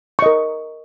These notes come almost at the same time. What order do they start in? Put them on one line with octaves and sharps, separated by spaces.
C#6 D#5 A#4